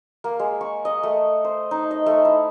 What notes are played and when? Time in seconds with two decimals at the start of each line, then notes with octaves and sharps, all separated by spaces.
0.24 A#3
0.39 G#3
0.61 C#6
0.85 D#5
1.03 A3
1.44 C5
1.71 D#4
1.91 D#5
2.06 A3
2.25 E4